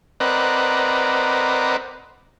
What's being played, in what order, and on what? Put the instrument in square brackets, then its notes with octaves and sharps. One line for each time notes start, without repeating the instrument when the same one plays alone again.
[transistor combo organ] C4 A#4 B4 D5 D#5 F#5